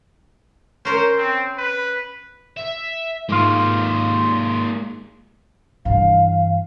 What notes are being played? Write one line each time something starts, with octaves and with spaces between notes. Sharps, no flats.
C#4 A#4 C5 C#5
C4
B4
E5
G#2 G#3 A#3 F4
G2 E3 F5